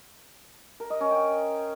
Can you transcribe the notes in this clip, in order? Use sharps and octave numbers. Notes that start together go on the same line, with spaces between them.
A#4
D#5
C#4
G5